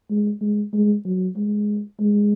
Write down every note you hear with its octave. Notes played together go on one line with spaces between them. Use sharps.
G#3
G#3
G#3
F#3
G#3
G#3